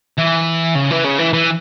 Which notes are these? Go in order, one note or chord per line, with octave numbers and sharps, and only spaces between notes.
E3
C#3
E3
C#3
E3
E3